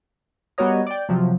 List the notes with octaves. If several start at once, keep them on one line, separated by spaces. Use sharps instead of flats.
G3 B3 F#4 A#4 C#5 D#5
D5 G5
C3 F3 F#3